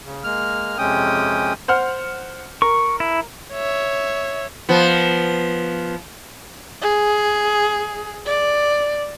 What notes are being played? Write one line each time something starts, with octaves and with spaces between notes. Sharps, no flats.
C#3
G#3 A#3 F6
F2 C3 G#3 C#4 G5 D#6
C5 F#5 F6
A#4 C#6
E4
C#5 E5
F3 B3
G#4
D5